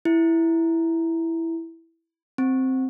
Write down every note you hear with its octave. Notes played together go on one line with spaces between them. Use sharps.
E4
C4